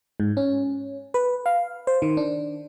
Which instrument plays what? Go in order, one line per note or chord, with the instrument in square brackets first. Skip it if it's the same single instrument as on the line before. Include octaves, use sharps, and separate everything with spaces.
[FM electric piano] G#2
C#4
B4
F5
C5
D#3
D4